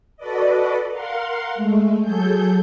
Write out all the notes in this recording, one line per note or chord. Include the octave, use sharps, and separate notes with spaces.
F#4 A4 B4 D5 D#5
A#4 F5 F#5 C6
G#3 A3
F#3 G#4 A4 G6